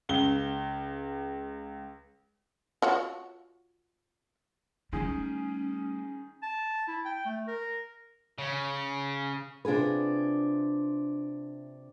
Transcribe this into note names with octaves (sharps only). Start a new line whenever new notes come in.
C#2 G7
F4 F#4 C#5
D#3 G3 A3 C#4 G#4
A5
E4
G5
A3
A#4
C#3
C3 D4 F4 G#4 B4